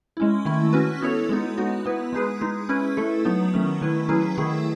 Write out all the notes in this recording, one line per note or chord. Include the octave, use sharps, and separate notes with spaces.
G#3 C#4 E4
D#3 A3 E4
C#4 F#4 B4
B3 E4 A4 C#5
G#3 B3 D#4
B3 D#4 F#4
B3 E4 B4
G#3 D#4 G#4 B4
G#3 D#4 G#4
C#4 E4 B4
A3 E4 A4
F#3 B3 D#4
D#3 F#3 A3 C#4
D#3 A3 E4 B4
F#3 C#4 E4 G#4 B4
D#3 A3 E4 G#4